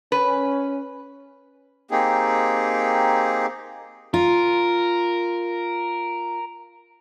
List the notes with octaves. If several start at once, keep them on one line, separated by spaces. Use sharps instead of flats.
C#4 B4
A#3 C4 D#4 G4 G#4
F4 A#4